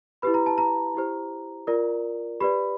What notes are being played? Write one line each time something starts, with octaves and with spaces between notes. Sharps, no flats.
E4 G4 B4 B5
A#5
A5
A#5
E4 G4 C5
F4 A#4 D5
G4 B4 D5 B5